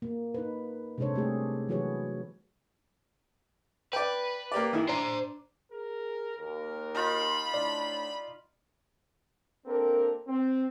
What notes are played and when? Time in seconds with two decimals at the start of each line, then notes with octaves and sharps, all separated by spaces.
0.02 A#3
0.34 D#4 B4
0.98 C3 G#3 D4 A4 C5 C#5
1.14 G3 A3 G4 G#4
1.69 E3 F#3 F#4 G#4 B4 C#5
3.93 B4 D5 G5
4.52 A#3 G4 D5
4.73 D#3 E3 E4
4.89 D4 C5 A#5
5.72 G#4 A#4
6.37 D#2 A#4
6.95 D#4 F4 B5
7.54 A2 D4 D5
9.66 A#3 C4 D4 G4 A4 A#4
10.28 C4